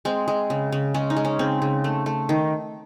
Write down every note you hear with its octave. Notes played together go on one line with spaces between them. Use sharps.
G#3 C4
G#3
C#3
C#3
G#3 C#4
D#4
G#3
C#4
C#3 C4
C#3
A3
A3
D#3